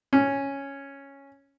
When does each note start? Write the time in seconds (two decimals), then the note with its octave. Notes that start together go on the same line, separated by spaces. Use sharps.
0.13 C#4